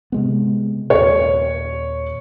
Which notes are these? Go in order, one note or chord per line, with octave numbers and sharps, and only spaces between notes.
C3 G#3 B3
D#2 A#2 C#5